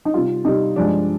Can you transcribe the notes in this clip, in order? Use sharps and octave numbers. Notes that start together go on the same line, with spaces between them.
D#4
C3 G3 F4
C3 G3 D#4
G2 F3 G#3 D4